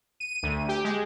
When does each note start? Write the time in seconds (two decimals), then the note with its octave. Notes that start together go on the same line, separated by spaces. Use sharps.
0.20 D#7
0.43 D2
0.68 G4
0.84 G#3